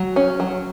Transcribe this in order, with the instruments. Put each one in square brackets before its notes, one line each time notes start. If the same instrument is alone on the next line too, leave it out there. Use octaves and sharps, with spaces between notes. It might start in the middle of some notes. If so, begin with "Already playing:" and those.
Already playing: [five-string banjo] F#3
C#4
F#3